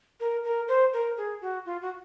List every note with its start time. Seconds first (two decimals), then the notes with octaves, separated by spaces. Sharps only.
0.20 A#4
0.44 A#4
0.68 C5
0.93 A#4
1.17 G#4
1.42 F#4
1.66 F4
1.82 F#4